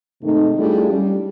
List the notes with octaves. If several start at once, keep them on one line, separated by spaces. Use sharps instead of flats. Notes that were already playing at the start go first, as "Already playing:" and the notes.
G#2 C3 D#3 A3 D#4
G3 A3 D4 E4 F4 G#4
G3 C#4